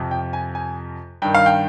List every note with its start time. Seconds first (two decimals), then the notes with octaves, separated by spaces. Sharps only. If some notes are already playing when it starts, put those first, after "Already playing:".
Already playing: F2 C3 F3
0.11 G5
0.33 G#5
0.55 G#5
1.22 G2 D#3 G5
1.34 F5
1.46 G5